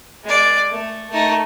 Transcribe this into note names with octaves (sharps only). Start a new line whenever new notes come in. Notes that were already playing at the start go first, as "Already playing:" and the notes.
G#3 D5
A3
A3 D#4